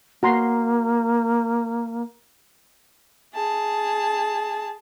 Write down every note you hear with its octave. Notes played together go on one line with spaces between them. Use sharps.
A#3 F#4 A#5 C6
G#4 A5